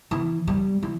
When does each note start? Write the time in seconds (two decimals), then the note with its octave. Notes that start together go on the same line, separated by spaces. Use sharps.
0.11 E3
0.48 G3
0.83 E3